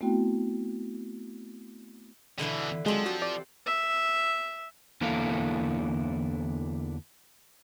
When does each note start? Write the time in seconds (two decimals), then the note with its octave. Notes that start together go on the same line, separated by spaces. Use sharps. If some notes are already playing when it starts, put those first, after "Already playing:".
0.01 A3 B3 C4 E4 F#4 G5
2.39 B2 D3 E3 E4 B4
2.86 F3 F#3 G#3 C4 D4
3.06 F#4 G4 A4 F#5
3.22 D5
3.66 E5
5.01 E2 D3 A#3 E4 A4 F5